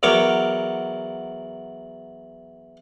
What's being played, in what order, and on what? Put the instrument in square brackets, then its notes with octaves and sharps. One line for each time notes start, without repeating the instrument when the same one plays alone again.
[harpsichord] E2 F#3 A#4 C#5 D6